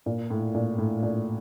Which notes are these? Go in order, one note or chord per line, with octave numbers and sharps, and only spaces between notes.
A#2
A2
A#2
A2
A#2